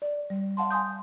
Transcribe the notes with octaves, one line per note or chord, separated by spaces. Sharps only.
D5
G3
F5 F#5 A5 C6
G#5 C6 D#6 G6